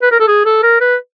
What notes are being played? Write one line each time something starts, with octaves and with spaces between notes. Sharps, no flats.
B4
A#4
A4
G#4
A4
A#4
B4